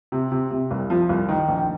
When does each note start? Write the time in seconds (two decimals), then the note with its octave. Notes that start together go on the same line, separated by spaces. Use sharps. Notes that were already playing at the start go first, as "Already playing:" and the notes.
0.12 C3
0.32 C3
0.51 C3
0.71 C2
0.90 F3
1.09 C2
1.29 D#3
1.49 A#1